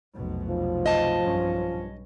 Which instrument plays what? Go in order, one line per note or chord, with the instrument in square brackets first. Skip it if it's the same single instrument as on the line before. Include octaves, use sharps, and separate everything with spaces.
[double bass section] F1 B1 B2
[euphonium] F3
[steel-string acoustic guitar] D#5 A5
[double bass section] B1 G2 C#4